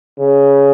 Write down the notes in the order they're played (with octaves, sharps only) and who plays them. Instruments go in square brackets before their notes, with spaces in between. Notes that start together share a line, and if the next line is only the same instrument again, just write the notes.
[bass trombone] C#3